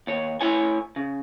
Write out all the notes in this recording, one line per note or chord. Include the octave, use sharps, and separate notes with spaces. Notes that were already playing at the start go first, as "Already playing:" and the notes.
D#2 C#5
A2 E4 C#5 G#5
C#3